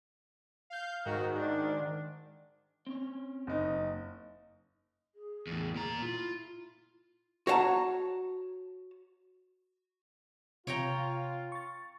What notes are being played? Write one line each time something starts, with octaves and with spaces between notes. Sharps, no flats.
F5 G6
G#2 D#3 F#4
D4
C4 C#4 C#5
F#1 D#4
G#4
E2 A2
A#2 A#5
E4 F4
F#4 C#5 F5 A5 A#5
C3 F4 C#5 G5 A#5
C#6 A6